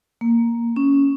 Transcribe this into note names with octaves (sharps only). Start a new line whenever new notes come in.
A#3
C#4